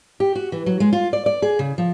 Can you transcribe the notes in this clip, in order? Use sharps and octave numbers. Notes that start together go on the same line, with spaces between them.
G4
F#4
E3
F#3
G#3
F4
D5
D5
G#4
C#3
F3